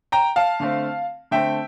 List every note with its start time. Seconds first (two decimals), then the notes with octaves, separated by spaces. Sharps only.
0.12 G5 A#5
0.36 F5 A5
0.60 D3 A3 C4
1.31 D3 A3 C4 E5 G5